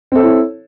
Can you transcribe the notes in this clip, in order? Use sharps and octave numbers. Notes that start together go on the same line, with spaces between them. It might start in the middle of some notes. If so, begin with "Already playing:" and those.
C4 E4 A4 C#5